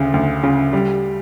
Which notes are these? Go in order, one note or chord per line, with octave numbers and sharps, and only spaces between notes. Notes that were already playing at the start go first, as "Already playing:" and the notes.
Already playing: D2 C#3
D2
C#3
G3